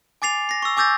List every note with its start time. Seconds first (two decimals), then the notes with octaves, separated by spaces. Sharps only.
0.22 G#5 D6 A6 C7 F7
0.49 A#6 C7
0.62 C#6 E6
0.77 G#5 D6 E6 G6 A6 A#6